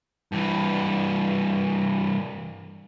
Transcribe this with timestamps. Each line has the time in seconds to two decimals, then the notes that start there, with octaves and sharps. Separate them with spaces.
0.32 G2 E3